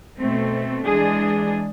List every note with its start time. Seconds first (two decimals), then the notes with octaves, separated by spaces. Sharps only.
0.19 B2 A3 C4
0.84 E3 G#3 D4 G#4